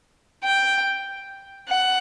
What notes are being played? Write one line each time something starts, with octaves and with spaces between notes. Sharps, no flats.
G5
F#5